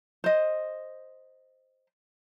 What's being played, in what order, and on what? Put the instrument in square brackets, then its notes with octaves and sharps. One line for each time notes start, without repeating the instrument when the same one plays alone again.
[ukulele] C5 D#5